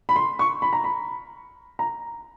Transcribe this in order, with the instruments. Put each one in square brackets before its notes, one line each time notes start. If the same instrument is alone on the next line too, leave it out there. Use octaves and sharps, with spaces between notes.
[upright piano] B5
C6
C#6
B5
A#5
B5
A#5